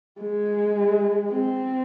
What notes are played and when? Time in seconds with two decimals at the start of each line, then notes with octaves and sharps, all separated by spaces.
0.21 G#3
1.31 C4